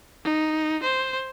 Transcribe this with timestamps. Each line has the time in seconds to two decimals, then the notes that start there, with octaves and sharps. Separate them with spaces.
0.24 D#4
0.83 C5